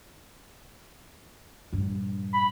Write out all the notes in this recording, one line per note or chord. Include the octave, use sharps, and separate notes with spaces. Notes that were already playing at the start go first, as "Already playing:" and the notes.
A#1 G2
B5